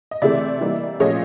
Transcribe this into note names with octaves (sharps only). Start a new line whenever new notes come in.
D#5
C3 E3 A3 C4 D5 E5
E3 G3 A#3 D#4
A#2 F3 A3 C#4 C#5 D#5